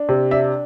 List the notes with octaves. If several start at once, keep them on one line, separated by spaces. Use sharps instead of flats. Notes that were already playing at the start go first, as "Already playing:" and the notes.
Already playing: D4
C3
D4 E5